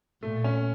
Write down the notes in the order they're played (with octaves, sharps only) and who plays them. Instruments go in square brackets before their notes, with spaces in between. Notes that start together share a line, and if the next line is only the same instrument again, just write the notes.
[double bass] A#2 [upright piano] A3
[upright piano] C#4